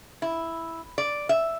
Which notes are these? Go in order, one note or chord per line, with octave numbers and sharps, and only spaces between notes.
E4
D5
E5